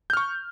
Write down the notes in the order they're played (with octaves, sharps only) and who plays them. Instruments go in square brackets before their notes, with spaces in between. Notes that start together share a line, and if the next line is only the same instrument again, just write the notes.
[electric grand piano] G6
F6
C#6